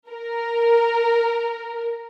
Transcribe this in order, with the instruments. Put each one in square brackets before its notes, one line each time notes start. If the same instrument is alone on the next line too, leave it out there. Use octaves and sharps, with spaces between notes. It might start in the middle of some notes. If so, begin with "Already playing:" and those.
[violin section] A#4